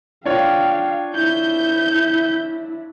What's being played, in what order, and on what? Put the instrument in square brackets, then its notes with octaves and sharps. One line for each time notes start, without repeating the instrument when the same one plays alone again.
[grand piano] D4 F4 C#5 [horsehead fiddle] F5 G5
[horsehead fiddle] E4 [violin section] G6